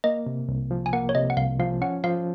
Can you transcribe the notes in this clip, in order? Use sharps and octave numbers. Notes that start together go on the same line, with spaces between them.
A#3 D#5
C3
C2
F3
G#5
A#3 F#5
C#5
C3 D#5
F#5
C2 F5
F3 F5
C#4 F#5
F3 F5